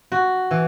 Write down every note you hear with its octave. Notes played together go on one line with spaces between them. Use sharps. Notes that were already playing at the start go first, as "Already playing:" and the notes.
F#4
E3